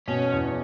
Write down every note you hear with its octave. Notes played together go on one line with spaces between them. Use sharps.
B2 C#4
E2